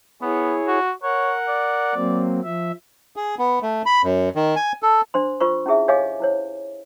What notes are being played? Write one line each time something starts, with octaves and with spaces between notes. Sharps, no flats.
B3 E4 G#4 C#5
F#4
A#4 C#5 F#5
D5
F#3 A#3 C4
F3 E5
G#4
B3
A3
B5
F#2
D#3
G#5
A4
D4 C5 C6
F4 A#4 C5 C#6
C#4 E4 G#4 E5
G4 C#5 D#5 F5 G#5 D6
E4 C5 C#5